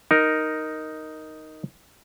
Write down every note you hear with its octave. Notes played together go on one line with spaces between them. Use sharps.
D#4 A#4